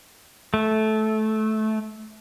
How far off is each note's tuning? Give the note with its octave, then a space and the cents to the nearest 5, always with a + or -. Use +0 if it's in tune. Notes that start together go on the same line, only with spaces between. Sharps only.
A3 -15